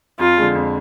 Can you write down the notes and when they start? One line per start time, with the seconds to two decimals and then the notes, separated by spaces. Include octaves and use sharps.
0.19 F2 F4
0.37 D3 G#3
0.55 F2